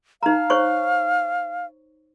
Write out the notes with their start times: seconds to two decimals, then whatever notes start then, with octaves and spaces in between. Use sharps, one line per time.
0.23 D#4 F5 A#5
0.50 C5 C#5 C#6